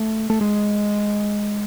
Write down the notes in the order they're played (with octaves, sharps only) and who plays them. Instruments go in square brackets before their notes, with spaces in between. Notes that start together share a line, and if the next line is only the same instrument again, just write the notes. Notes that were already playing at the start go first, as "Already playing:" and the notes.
Already playing: [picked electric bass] A3
A3
G#3